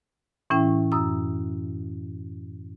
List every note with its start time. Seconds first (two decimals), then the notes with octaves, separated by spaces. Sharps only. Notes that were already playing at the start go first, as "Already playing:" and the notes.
0.50 A2 E3 C#4 E4 E5 G5
0.92 F#2 D#6 E6